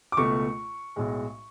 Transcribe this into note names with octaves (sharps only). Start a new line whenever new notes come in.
D6
C#2 B2 A3 C#6
B1 A2 G#3